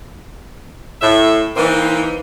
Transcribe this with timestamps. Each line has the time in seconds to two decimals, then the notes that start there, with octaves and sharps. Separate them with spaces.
1.02 A2 E5
1.57 E3 A#3 C4 D#4